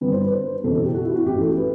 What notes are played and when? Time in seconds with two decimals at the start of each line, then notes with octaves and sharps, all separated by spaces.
0.01 G1 G2 D3 B4
0.12 C5
0.21 B4
0.32 C5
0.63 F#1 E2 B2 A4
0.75 A4
0.84 G4
0.94 F#4
1.05 E4
1.15 F#4
1.25 A1 A2 E3 G4
1.41 A4
1.57 B4